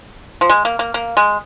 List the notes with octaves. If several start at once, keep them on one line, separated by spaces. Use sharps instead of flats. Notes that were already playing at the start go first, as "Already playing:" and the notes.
F3
G#3
A#3
A#3
A#3
G#3